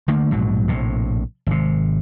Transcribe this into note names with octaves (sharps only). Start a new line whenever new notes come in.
D3 A3 A#3
A#1 G#2 B2 F#3
A#1 A2 C3
G#1 C3